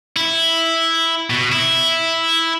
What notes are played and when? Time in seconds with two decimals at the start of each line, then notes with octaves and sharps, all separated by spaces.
0.16 E4
1.30 B2
1.52 E4